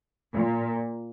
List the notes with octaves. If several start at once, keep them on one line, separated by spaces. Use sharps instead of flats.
A#2